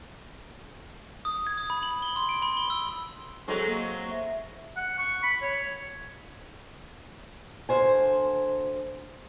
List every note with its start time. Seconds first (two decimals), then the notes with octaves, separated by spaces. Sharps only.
1.25 D#6
1.47 G#6
1.58 D#6
1.70 B5
1.83 F#7
2.02 G7
2.16 C6
2.29 D7
2.42 B5
2.57 G7
2.70 E6
3.48 F#3 G#3 C4 A4
3.67 A#3
4.10 E5
4.76 F#5
4.99 C#6
5.23 B5
5.42 C#5
7.69 D2 C5 G#5